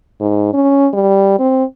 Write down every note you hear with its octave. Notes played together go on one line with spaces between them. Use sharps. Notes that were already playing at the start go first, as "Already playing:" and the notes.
G#2
C#4
G3
C4